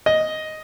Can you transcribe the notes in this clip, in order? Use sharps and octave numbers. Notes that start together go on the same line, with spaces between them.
D#5